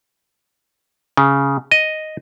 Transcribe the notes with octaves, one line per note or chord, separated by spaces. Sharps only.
C#3
D#5